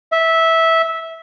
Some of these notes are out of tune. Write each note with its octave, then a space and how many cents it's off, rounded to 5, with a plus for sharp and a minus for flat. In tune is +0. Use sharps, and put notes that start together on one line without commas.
E5 -15